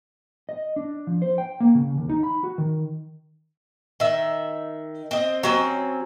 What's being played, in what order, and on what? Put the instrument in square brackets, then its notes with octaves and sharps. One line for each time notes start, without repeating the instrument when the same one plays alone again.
[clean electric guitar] D#5
D4
F3
C5
G5
A#3
C#3
D#2
D#4
B5
F#4
D#3
[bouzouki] D#3 E5
C4 D#5
F#3 C4 C#4